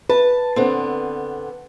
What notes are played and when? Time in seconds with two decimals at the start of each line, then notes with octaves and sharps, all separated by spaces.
0.10 B4 A5
0.56 D3 B3 C4